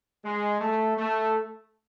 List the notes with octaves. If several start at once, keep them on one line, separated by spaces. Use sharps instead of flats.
G#3
A3
A3